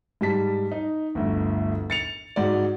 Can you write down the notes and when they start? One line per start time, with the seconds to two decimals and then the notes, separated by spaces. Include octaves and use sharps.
0.21 G#2 G3 A5 B6
0.72 D#4
1.15 G1 D2
1.90 A6 C#7 F7
2.36 G#2 F#4 D5